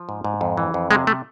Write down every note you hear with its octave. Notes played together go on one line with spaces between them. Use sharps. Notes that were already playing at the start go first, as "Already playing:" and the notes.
Already playing: F3
G#2
G#2
F2
E3
F2
C3 G#3
A3